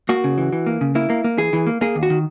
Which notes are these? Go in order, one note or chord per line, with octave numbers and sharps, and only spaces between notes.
A#3 F#4
C#3
E3
E3
A#3
C#3
A#3 E4
A#3
A#3
E3 G#4
E3
A#3
A#3 G#4
D#2
F#4
D#3